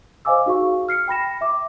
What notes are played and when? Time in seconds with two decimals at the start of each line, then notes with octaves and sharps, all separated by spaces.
0.25 C5 D#5 F5 G#5 D6 E6
0.46 D#4 F#4 G#4 F5 C#6
0.89 F6 C7 C#7
1.08 G5 B5 A#6 E7
1.41 E5 D6